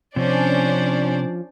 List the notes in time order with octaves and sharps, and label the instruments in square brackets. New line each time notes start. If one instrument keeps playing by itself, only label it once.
[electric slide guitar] C3 [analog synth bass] F3 [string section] C#4 D4 [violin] C5 D5